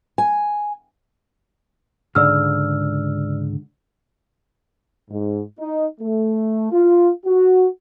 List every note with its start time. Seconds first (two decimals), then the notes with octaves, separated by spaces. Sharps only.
0.18 G#5
2.15 C#2 G#2 D3 D5 E6 F6
5.10 G#2
5.58 D#4
6.01 A3
6.72 F4
7.26 F#4